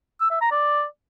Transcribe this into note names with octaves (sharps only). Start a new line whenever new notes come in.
E6
E5
A#5
D5